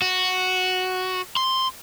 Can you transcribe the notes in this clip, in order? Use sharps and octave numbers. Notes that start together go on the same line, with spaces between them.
F#4
C6